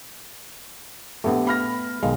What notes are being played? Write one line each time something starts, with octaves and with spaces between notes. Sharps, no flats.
A#1 A3 B3 G4
B5 F6 A#6
B1 D#3 G#3 F5